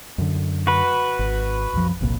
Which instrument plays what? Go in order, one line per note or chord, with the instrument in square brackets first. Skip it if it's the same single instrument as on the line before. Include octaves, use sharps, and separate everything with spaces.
[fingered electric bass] F#2 D3
[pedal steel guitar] F#4 B4
[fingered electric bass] G#1
C2 F#2 F3
G1 C2 A#2